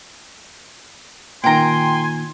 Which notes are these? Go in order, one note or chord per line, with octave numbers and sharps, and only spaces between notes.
A#2 D#3 G5 G#5 A#5 C6